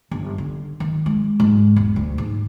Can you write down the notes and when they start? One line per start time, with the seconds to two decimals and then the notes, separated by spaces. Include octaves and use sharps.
0.11 G1
0.38 D3
0.80 D#3
1.06 G#3
1.40 G#2
1.76 E1
1.96 D2
2.18 G#2